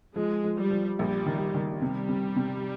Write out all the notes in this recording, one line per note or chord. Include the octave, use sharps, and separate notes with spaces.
F3 G#3
F3
G3
F3
A#1 G3
D#3
D#3
C3 G3
C3
C3